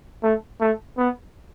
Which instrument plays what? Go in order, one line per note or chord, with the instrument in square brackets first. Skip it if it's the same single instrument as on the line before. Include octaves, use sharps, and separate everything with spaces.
[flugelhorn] A3
A3
B3